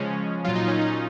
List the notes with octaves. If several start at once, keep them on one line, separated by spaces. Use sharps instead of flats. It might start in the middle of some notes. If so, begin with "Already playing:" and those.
Already playing: C#3 F3 G#3 C#4
A#2 F#3 F4
D#4
C#4
D#4